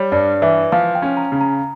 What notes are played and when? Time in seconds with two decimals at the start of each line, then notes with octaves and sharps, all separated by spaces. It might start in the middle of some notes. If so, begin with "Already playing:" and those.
Already playing: G3 C#5
0.12 G2 D5
0.42 E3 E5
0.72 F3 F5
0.95 G5
1.02 C#4
1.17 A#5
1.32 C#3
1.41 A#5